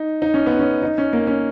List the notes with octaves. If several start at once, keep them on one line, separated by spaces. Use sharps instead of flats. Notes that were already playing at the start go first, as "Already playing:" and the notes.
Already playing: D#4
D#4
C#4
B3
C#4
D#4
C#4
A#3
C#4